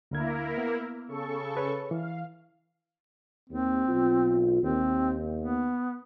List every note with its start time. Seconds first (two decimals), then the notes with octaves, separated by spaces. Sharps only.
0.11 D2 D3 A#3 E4 A#4 G#6
0.58 B3
1.08 C#3 A4 C#6
1.55 G#4 B4 C#5
1.91 E3 F5
3.50 D#2 C4
3.88 B1 F4
4.62 D#2 C4
5.41 B3